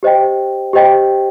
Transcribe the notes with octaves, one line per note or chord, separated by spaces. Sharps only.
G4 C5 D#5 G5
G4 C5 D#5 G5